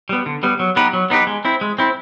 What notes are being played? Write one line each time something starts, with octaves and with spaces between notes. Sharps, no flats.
G3 B3
D3
G3 B3
F#3
B3 D#4 G4 B4
F#3
B3 D#4 G4 B4
G#3
C4 E4
G#3
C4 E4